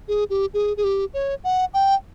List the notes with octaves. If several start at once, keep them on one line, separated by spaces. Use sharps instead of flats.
G#4
G4
G#4
G#4
G4
C#5
F#5
G5